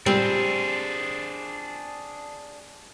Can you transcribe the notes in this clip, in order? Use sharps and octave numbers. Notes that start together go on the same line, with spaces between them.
G3 C4 D4 G#4